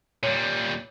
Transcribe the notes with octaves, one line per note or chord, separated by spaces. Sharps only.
A#2 G3 C#5